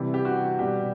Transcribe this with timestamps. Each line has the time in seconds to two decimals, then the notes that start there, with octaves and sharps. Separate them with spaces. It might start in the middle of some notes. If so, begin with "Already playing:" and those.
Already playing: C3 E3 G3
0.14 G4
0.25 F#4
0.59 B2 G3 G4